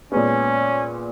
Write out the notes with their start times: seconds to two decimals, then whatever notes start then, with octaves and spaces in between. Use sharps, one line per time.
0.12 A#2 G#3 B3 C#4